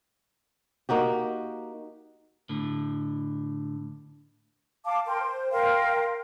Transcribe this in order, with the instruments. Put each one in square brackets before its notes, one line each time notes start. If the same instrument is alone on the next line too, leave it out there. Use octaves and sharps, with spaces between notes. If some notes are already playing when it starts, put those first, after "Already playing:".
[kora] A#3 D#4 F#4 G4
[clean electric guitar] A2 D3
[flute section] F5 A5 D6
A#4 G5 C6
C5
A#4 F5 G5 C6